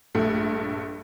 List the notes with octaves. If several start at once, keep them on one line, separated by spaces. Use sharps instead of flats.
A#1 G2 A3